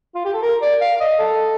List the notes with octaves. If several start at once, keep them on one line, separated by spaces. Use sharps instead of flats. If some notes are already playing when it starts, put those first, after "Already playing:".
F4
G4
A4
A#4
D5
F5
F5
D#5
A4